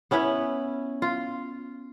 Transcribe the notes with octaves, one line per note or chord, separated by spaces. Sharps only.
B3 C#4 E4 B4
F4